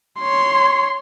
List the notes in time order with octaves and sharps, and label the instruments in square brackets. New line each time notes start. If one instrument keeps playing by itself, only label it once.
[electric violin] C#5 C6